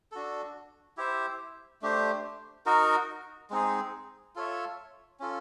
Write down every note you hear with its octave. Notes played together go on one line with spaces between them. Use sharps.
D4 F#4 A4
E4 G4 C5 E5
A3 D4 G4 C5
D#4 F#4 A#4
G#3 C4 D#4 G#4
F4 A4 C#5 E5
C#4 F4 A4